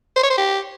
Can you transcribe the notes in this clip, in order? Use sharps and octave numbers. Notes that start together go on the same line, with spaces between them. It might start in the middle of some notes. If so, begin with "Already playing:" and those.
C5
C#5
C5
G4